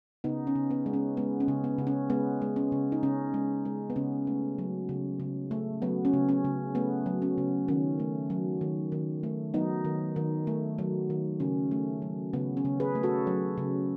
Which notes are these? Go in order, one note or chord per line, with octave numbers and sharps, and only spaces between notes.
C#3 B3 D#4
C#4
C#3
B3
G#3
C#4
G#3 B3
C#4
C#3
B3
C#3
C#4
G#3 B3
G#3
C#4
C#3
D#4
C#3 C#4
G#3
G#3
B3
C#3 C#4
A3
F#3
C#3
C#3
A3
F#3 B3
C#4
C#3
C#4
C#3
A3 B3
F#3
C#4
C#3
D#3 C#4
A3
F#3
D#3
D#3
A3
F#3 B3 D#4
D#3
D#3
A3
F#3
D#3
C#3 C#4
A3
F#3
C#3 B3
C#4
C#3
G#4 B4
A3
F#4 A4
F#3
C#3